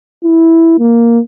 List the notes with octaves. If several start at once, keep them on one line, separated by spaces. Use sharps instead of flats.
E4
A#3